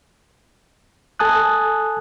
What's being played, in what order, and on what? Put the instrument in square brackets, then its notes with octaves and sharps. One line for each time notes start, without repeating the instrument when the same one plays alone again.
[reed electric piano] A4 G#5 A5 D#6 F#6